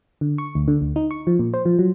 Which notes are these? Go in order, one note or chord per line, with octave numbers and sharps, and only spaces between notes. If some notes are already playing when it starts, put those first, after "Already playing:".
D3
C#6
D2
D3
D2
D#4
C#6
F3
A#2
C5
F3
F#3